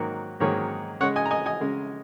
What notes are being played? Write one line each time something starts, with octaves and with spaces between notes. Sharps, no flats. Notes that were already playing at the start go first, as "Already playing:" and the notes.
Already playing: G#2 D#3 F#3 A#3 F#4 A#4
G#2 D#3 F#3 A#3 G#4 C#5
C#3 G#3 C#5 F#5
D#5 G#5
A#5
D#5 G#5
D#5 G#5
C#3 G#3